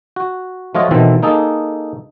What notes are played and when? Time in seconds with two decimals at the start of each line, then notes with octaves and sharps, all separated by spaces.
0.16 F#4
0.75 F3 A3 F4 F#4 C#5 D#5
0.91 B2 D#3 E3 C4 A4
1.23 A#3 D#4 G#4 A4